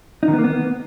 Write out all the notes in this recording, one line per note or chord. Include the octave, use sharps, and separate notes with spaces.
D#4
D#3
B3
A#3
B3